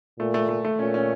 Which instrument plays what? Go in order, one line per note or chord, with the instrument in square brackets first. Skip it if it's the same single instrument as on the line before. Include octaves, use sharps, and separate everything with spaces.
[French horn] A#2 [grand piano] A3
[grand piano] A3
A3
A3
[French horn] A#2 [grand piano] C#4
[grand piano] C#4